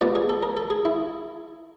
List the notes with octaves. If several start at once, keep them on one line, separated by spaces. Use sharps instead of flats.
A#2 G3 B3 D5
G#4
A4
A#4
A4
G#4
E4